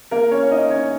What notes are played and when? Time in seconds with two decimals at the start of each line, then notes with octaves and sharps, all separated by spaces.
0.11 A#3 A#4
0.31 C#4 C#5
0.51 D#4 D#5
0.70 C#4 C#5